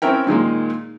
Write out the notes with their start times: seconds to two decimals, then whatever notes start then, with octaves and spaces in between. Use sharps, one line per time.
0.02 C4 C#4 E4 A#4 G5
0.27 A#2 D#3 G#3 A#3